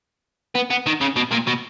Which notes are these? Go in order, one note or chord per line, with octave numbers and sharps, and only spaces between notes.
B3
B3
D#3
C#3
B2
A#2
B2